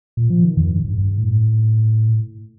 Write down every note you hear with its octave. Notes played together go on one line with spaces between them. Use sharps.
A#2
F3
D#3
F2
G2
G2
G2
A2